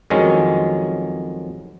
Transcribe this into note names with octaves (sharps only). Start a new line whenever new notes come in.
F2 D#3 F#3 G#3 C#4